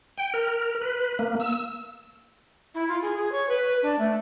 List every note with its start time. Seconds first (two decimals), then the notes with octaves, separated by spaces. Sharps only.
0.18 G5
0.34 A#4
0.82 B4
1.19 A#3
1.40 E6
2.74 E4
2.88 F4
3.02 G#4
3.17 G#4
3.31 C#5
3.48 B4
3.82 D4
3.98 A3